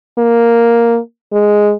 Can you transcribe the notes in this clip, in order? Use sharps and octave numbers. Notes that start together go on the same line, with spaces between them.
A#3
G#3